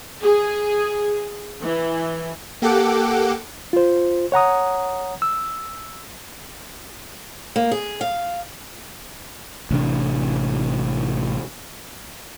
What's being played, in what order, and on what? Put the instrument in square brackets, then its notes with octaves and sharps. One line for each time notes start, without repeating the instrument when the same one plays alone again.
[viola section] G#4
E3
[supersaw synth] A#3 G4 A4 F#5 D6
[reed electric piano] F4 C5
C#5 F#5 A#5 D#6
E6
[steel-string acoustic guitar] A#3
G#4
F5
[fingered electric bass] A1 C3 C4 D4